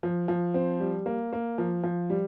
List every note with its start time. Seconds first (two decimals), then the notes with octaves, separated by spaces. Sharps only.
0.03 F3
0.28 F3
0.54 C4
0.80 G3
1.06 A#3
1.33 A#3
1.58 F3
1.83 F3
2.10 G3